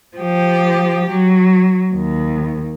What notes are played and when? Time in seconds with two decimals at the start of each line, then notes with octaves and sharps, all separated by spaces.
0.17 F3 G4
1.10 F#3
1.94 D#2